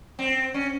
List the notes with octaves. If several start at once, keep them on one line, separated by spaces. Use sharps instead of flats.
C4
C#4